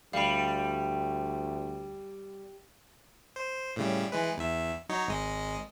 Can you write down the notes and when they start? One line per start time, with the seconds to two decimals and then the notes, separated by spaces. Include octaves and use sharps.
0.13 D2 G3 F5 B5
3.36 C5
3.76 A2 C#3 G3
4.12 E3 G#3 B4
4.38 E2 E5
4.89 F#3 D#4 C#5
5.08 G#1 G#3 D#5